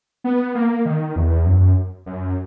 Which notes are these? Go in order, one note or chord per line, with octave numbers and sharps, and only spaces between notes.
B3
A#3
D#3
E2
F#2
F#2